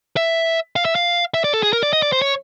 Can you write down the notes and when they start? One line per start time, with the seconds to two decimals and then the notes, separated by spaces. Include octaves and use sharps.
0.17 E5
0.76 F5
0.85 E5
0.95 F5
1.34 E5
1.44 D5
1.54 A4
1.63 G#4
1.73 A#4
1.83 D5
1.93 D#5
2.02 D5
2.12 C5
2.22 C#5